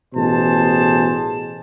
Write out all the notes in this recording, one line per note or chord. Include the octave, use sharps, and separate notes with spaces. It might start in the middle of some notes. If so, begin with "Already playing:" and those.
A1 B2 G#4 C5 A5